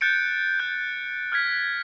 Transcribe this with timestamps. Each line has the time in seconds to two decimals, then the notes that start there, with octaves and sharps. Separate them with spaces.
0.01 F#6 G6 A6 C#7 D7
0.59 F#6 G6
1.32 F6 F#6 G#6 B6